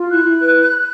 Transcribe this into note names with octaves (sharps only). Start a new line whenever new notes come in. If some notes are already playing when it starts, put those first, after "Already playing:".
Already playing: F4
E4 F#6
E4
B4